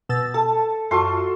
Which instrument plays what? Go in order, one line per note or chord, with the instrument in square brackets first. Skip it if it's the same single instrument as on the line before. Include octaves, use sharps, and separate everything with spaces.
[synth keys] B2 E6 A6
[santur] A4 [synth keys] A5
[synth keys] F#2 F4 [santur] F#4 A4 C6